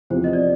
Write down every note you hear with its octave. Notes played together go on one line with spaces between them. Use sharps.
E2 C3 F3 C5
D#5
D5